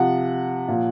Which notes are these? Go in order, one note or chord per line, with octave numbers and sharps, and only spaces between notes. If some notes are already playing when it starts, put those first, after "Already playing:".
Already playing: C3 F3 F#5
A#2 F3